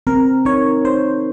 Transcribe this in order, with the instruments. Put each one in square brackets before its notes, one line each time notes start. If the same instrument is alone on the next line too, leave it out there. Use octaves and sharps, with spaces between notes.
[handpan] C4 [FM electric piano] A#4
[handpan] D#4 [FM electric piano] C#5
[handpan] D#4 [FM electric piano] C5